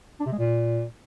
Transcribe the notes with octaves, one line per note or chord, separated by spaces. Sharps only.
D4
C3
G#3
A#2